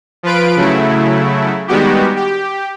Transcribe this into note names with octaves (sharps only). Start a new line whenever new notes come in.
F3 F4 B4 D7
C#3 F#3 A3 E4
D#3 G3 G#3 B3 F#4 G4
G4